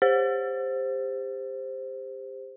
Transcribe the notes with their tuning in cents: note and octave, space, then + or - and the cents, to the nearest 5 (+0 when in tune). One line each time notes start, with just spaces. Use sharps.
G4 +30 C5 +0